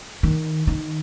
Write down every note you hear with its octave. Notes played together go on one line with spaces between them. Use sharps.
D#3
D#3